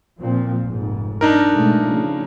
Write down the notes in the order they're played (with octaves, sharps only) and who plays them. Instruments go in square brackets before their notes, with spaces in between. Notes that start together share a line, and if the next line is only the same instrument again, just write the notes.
[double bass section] A#2 F3 C4
F1 G#2
[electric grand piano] D4 D#4 A#4
[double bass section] B2 G#3 A3
C#3 F3